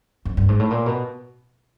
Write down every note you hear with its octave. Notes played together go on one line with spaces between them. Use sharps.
F2
G2
G#2
A2
A#2
B2